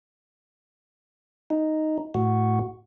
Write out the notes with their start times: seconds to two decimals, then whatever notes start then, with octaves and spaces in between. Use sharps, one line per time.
1.50 D#4
2.14 A2 F#4